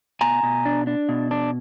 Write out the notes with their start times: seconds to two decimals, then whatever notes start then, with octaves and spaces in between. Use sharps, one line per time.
0.21 B2 G#5 A#5
0.43 B2
0.65 D4
0.87 D4
1.09 B2
1.31 D4